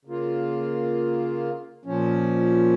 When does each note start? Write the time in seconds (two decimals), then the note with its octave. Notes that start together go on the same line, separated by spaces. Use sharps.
0.05 C#3 A#3 F4
1.85 A#2 F3 C#4